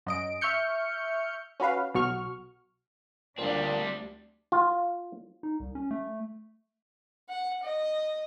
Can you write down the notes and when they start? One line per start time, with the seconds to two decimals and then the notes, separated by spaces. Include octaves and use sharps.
0.06 F#2 D#5 D7
0.41 E5 C#6 F6 G6 C#7
1.60 C#4 F#4 B4 F5
1.94 B1 B2 F#4 C#6 F6
3.38 D2 A#2 G3 C4 D4
4.52 F4
5.43 D#4
5.60 C2
5.75 C#4
5.91 A3
7.29 F#5
7.63 D#5